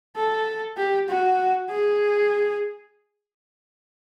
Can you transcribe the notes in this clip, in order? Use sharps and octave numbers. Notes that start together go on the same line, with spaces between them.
A4
G4
F#4
G#4